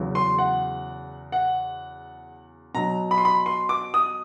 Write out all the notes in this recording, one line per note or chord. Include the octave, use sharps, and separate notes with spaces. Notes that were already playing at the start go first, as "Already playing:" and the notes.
Already playing: E2 C#3 F#3
C6
F#5
F#5
B2 F#3 A#5
B5
C6
B5
C6
D6
D#6